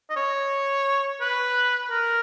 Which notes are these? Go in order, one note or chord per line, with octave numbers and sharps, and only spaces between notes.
D#5
C#5
B4
A#4